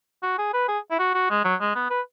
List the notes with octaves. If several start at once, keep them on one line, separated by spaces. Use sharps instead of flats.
F#4
G#4
B4
G#4
E4
F#4
F#4
G#3
F#3
G#3
B3
B4